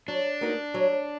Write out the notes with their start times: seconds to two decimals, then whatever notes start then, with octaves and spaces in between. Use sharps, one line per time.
0.08 F#3 D4
0.41 A#3 D#4 F#4 A#4
0.74 F#3